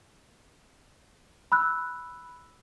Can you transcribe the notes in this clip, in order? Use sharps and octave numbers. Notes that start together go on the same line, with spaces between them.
B5 E6 F#6